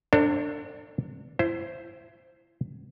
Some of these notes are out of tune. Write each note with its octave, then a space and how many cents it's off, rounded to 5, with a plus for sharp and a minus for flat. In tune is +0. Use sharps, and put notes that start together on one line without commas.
D4 +0 A4 +40 C5 +40
E4 +25 C5 +0